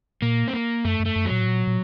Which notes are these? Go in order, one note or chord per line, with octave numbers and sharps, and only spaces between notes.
A#2 A#3
C4
A#3
F#2 A3
F#2
A3
F#2
F#3
A#2
A2
A#2
A#2